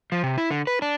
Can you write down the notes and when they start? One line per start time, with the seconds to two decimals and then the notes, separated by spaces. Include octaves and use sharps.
0.12 F3
0.23 C3
0.38 E4
0.51 D3
0.67 B4
0.82 D4